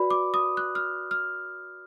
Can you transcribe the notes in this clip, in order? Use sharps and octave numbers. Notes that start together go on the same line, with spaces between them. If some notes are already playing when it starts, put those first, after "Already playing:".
Already playing: F#4 B4 D5 B5
D6
D#6
F#6
F6
F6